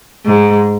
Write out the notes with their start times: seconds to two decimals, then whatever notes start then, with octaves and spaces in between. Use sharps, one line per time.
0.26 G#2